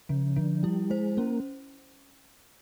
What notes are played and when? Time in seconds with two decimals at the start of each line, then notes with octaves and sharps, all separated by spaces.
0.09 C#3 F3
0.36 D3 F3
0.63 G3 E4
0.90 G#3 C5
1.17 A#3 C#4